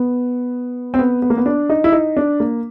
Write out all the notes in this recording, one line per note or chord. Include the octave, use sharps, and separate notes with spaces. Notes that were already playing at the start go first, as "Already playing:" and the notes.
Already playing: B3
C4
B3
B3
A#3
B3
D4
D#4
E4
D#4
D4
A#3